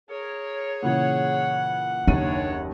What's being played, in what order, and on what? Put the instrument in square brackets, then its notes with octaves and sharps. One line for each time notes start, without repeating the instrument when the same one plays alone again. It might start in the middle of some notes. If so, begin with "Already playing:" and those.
[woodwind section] G#4 C#5 [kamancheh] A#4
[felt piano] A#2 C#3 E3 [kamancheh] F#5
[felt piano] F#1 D#2 D#7 [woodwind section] D4 C#5 [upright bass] D#4